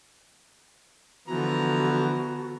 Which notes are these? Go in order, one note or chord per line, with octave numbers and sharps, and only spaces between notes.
D3 E3 F3 B3 F#4 A#5